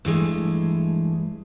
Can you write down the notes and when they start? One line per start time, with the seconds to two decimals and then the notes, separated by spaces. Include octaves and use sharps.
0.05 G2 E3 G#3 A3